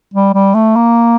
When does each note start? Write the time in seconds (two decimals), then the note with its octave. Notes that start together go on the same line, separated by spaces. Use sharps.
0.14 G3
0.34 G3
0.54 A3
0.76 A#3